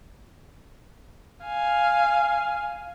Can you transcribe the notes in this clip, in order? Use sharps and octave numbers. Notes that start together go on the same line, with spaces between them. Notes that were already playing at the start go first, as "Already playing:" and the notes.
F5 G#5